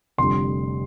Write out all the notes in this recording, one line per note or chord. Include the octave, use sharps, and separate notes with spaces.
F1 F2 D3 G3 C6